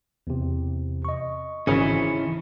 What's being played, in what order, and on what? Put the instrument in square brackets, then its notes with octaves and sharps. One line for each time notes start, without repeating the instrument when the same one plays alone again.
[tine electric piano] E2 C3
D#5 C#6
[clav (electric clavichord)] G#1 C#3 A#5 [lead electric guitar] E3 C#4